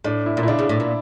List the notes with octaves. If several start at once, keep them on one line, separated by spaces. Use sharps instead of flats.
A2 D4
E4
A#2
E4
C#3 D4
C#3
A2
A#2